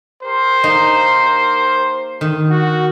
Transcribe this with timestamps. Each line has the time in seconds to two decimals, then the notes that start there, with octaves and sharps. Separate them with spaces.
0.23 G4 A#4 C5
0.64 A#3 D#4 D#5
2.21 D#3
2.50 F#4